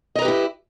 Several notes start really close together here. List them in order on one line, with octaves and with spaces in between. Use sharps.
D#5 A#5 B4 G4 E4